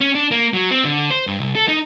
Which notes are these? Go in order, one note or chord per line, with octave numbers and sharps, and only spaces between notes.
C#4
D4
A#3
F#3
C4
D3
C5
G2
C2
A4
D#4